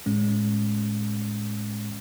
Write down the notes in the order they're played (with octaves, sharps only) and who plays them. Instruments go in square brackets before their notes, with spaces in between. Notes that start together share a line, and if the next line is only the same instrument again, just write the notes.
[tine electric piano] A2 G#3 C#4